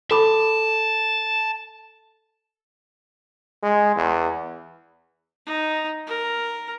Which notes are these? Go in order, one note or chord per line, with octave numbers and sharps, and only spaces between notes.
A4 A5 B5 D6
G#3
E2
D#4
A#4